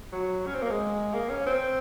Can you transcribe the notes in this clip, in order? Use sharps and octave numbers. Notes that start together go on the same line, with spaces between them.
F#3
C#4
C4
A#3
G#3
A#3
C#4
C4